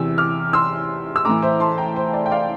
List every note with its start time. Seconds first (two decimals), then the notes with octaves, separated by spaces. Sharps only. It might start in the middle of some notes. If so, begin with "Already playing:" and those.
Already playing: E2 C3 E3 E6
0.18 D6 F6
0.53 C6 E6
1.16 E6
1.25 A2 E3 A#5 D6
1.42 C5 E5
1.60 A5 C6
1.78 G5 A#5
1.96 C5
2.14 D5
2.26 G5
2.31 D5 F5